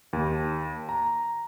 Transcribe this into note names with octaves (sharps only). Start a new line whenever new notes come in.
D#2
A#5